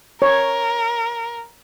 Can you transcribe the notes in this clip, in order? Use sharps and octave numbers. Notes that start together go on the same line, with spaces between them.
A#4 C#5